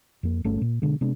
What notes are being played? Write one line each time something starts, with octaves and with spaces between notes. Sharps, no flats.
F2 A#3
G1 A3 C#4
A#2
B2 D3 G#3
C3 G#3 B3 D4